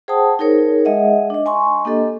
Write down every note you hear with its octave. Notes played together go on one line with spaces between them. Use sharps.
G#4 C5 F#5 G5 A5 D#6
D#4 G#4 A#4 C#5
G#3 G#4 D#5 E5 F#5
D4 D#5
G#5 C6 C#6
A#3 D4 G4 A4 D#5